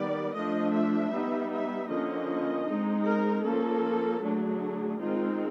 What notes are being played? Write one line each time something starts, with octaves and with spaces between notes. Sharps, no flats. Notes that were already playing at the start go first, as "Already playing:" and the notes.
Already playing: D#3 G3 B3 D5
F3 A3 D4 D#5
E5
G3 B3 D#4
E5
D3 F3 A#3 C#4 D#5
G#3 C4 D#4
A#4
F3 A#3 C#4 A4
D3 F#3 A3 D4 G#4
D#3 G#3 C4 D#4 F4